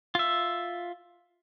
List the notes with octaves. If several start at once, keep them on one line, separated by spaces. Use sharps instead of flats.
F4 E5